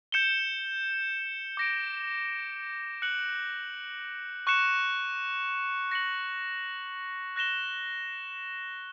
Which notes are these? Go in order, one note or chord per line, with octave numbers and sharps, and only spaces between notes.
G6 C#7 E7 G7
D6 A#6 D7
F#6 C#7 F#7
C#6 F#6 C#7 E7
A#6 C#7 F#7
F#6 A#6 E7 G7